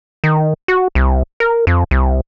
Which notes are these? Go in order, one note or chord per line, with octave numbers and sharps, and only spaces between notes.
D#3
F#4
C2
A#4
F2
C2